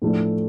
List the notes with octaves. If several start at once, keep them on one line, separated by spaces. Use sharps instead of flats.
A2 F3 A3 D4